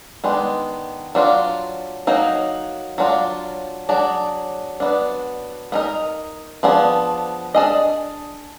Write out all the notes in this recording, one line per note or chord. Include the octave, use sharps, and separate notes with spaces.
D#3 G#3 B3 D4
F#3 D4 F4
F#3 A#3 D#4
F#3 D4 F4
F#3 D4 G#4 D5
F#3 B3 D4
B3 D#4 A#4 D#5
F3 B3 D4 G#4
D4 G#4 D#5